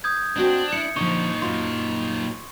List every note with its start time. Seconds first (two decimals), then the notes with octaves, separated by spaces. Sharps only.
0.04 D#6 G6 G#6
0.37 C4 D4 F#4 D#5
0.72 E4 C#7
0.96 A#2 D3 F3 D#4 C#6
1.42 F#2 F4 C6